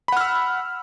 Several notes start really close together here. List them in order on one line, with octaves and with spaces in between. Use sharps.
B5 F#5 F6 E6